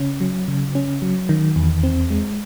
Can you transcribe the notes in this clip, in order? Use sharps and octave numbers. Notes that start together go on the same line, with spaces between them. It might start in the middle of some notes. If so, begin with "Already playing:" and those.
Already playing: C#3 C#4
F#3
C#3
C#4
F#3
D#3
E2
C4
G#3